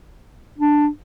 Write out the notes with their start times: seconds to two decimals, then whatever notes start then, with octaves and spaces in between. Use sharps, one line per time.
0.58 D4